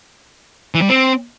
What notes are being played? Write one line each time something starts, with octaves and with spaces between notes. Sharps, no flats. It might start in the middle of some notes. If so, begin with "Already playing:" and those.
E3
G3
C4